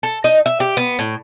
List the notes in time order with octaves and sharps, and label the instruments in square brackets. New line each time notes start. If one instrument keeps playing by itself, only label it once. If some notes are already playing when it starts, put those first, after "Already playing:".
[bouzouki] A4
D#4
E5
G4
B3
A2